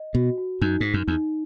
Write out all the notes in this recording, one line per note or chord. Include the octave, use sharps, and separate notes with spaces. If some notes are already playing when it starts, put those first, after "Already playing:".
Already playing: D#5
B2 F#4
F#4
F#2 D#4
G#2 D#4
F#2
E2 D#4